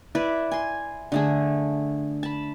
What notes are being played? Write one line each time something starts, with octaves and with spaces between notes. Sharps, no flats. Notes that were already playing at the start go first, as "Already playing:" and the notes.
E4 B4 D5
G#5 C6
D3 A3 G#4
A5 B5